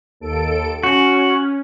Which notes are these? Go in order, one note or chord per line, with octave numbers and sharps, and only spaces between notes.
D#2 A4 D7
C#4 F#4